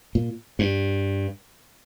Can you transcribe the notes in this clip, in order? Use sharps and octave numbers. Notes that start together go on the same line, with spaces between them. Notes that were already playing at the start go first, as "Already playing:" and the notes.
A#2
G2